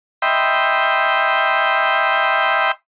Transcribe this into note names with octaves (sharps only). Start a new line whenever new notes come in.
D#5 E5 G5 B5 C6